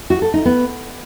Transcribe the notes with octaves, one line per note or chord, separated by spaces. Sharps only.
F#4
A4
D#4
B3